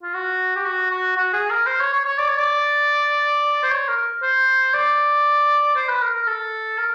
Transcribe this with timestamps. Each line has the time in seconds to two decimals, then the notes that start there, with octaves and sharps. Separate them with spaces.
0.03 F4
0.14 F#4
0.56 G4
0.65 F#4
0.91 F#4
1.16 F#4
1.33 G#4
1.50 A#4
1.67 C5
1.80 C#5
1.93 C#5
2.05 C#5
2.18 D5
2.29 C#5
2.39 D5
3.63 C5
3.71 C#5
3.89 A#4
4.23 C5
4.74 D5
5.76 C5
5.89 B4
6.02 A#4
6.15 A#4
6.27 A4
6.78 A#4